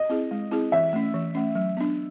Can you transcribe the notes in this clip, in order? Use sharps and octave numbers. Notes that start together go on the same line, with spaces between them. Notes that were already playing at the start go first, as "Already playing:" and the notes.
Already playing: D#5
C4 E4 G#4
G#3
C4 E4 G#4
E3 E5
A3 C#4
E3
A3 C#4
F#3
B3 D4